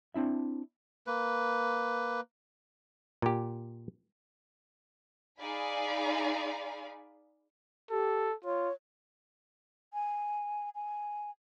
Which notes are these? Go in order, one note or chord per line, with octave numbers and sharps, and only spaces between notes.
C4 D4 E4 E5
A#3 B4
A#2 G4
D#4 G#4 D5 F5 G#5 B5
G4 A4
F4 C#5
G#5
G#5